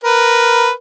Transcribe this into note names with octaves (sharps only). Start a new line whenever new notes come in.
A#4 B4